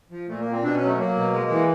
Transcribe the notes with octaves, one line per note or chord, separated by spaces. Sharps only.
F3
A#2 A3
A#3
A#2
C4
B2 D4
C#4
F#3
A3
F#3 A#3
B2
G#3
E3